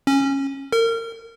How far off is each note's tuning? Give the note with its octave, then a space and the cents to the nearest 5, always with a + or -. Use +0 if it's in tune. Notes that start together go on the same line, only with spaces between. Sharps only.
C#4 -15
A#4 -30